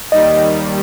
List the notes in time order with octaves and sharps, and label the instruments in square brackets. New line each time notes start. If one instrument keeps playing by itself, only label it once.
[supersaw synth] D#2 D#3 G3 [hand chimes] D#5